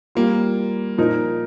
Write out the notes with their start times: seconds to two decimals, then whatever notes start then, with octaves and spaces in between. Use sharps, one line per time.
0.15 G3 A#3 F4
0.98 A#2 F3 D#4 A#4